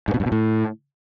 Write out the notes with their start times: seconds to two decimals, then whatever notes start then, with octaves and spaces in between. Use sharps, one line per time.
0.08 G#2
0.14 B2
0.20 G2
0.26 B2
0.32 A2